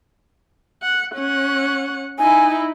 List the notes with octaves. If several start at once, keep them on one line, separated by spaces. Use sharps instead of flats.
F#5
C#4 F#5
D#4 E4 G#5